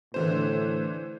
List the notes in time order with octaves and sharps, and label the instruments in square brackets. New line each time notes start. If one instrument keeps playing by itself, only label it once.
[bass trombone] A2 [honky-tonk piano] D3 E3 C5